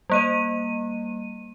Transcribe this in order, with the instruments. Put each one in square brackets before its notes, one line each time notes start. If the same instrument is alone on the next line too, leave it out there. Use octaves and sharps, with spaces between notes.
[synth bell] G3 A#3 D#7